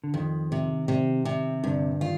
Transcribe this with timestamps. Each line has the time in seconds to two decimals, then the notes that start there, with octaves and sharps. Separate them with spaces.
0.04 D3
0.14 F2 D#3
0.52 C3
0.88 C3
1.25 C3
1.63 G2 D3
2.01 D#3 F4